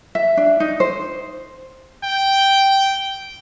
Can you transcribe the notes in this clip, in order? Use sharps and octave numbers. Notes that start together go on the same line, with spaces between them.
E5
D4
D#4
C5
G5